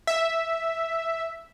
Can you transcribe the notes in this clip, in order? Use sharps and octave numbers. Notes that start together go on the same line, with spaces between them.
E5